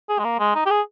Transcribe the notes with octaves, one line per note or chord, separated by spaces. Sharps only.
G#4
G#3
A#3
G#3
D#4
G4
G#4